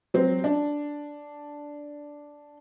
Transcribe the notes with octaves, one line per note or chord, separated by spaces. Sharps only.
F#3 C4
D4